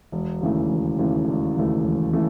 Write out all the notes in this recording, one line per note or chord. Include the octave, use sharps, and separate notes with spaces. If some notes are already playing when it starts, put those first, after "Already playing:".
E1
D#2 C#3 E3 A3
E1
D#2 C#3 E3 A3
E1
D#2 C#3 E3 A3
E1
C#3 E3 A3